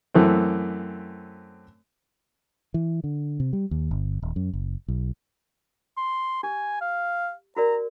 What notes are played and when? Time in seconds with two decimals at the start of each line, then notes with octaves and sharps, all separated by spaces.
0.14 F#2 E3 A3 C4
2.74 E3
3.04 D3
3.40 C3
3.53 G3
3.71 D#2
3.91 G1
4.22 D#1
4.36 F#2
4.53 F#1
4.88 B1
5.97 C6
6.43 G4 G#5
6.81 F5
7.56 F#4 A#4 D5 A#5